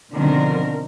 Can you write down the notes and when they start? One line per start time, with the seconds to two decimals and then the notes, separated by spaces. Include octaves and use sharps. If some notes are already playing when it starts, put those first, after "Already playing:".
0.12 B2 D3 D#3 F3 C4 A#4